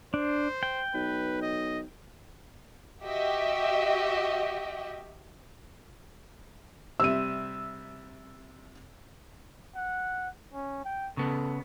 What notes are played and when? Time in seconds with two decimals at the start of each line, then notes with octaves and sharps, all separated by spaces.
0.14 D4 C5
0.63 G5
0.94 B1 B4
1.42 D#5
3.04 F#4 G4 D#5 E5 G5
7.00 C3 G3 E5 E6 D#7
9.76 F#5
10.54 C#4
10.85 G5
11.17 C#3 B3 A4